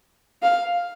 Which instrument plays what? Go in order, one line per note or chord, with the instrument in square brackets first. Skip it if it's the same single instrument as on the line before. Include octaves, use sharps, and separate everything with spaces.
[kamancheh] F5